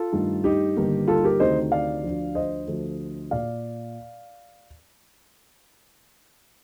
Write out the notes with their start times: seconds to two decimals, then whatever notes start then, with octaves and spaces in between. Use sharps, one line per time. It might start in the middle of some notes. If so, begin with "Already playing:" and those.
Already playing: F4 A4
0.12 G2 D#3 A3
0.44 D#4 G4
0.77 G1 G2 D#3 A#3
1.08 F4 A4
1.24 G4 A#4
1.40 D2 C3 D#3 A3 C4 C5 D#5
1.72 D5 F5
2.03 D2 D3 F3
2.35 C5 D#5
2.67 D2 D3 F3 A3
3.31 A#2 D5 F5